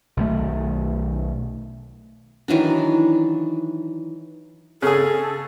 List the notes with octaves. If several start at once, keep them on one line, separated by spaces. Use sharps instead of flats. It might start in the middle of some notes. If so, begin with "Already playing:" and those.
B1 D#3 A3
D#3 E3 F#3 D4
C#3 G#4 A4